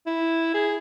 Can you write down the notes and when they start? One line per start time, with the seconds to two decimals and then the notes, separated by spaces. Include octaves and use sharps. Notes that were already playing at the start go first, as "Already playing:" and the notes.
0.06 E4
0.54 G#4